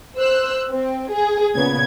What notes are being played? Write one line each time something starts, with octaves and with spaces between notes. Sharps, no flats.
C5 E6 F#6
C4
G#4
A#2 C#3 B3 G#6